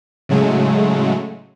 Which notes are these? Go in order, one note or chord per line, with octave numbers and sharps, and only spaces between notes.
A2 C#3 F#3 G#3 A3